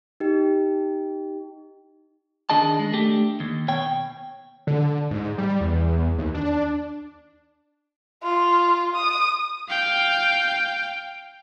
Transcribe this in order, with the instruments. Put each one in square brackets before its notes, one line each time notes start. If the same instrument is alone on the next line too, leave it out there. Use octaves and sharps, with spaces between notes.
[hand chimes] D#4 G4
[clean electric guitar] D#3 D4 G#4 D#5 A5
G#3
A3 D4 G4
D#2
B2 C#5 G5
[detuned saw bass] D3
G#2
G3
E2
D#2
D4
[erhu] F4
D#6
[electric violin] F5 G5